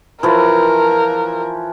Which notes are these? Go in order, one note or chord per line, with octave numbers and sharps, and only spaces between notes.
E3 F3 A#4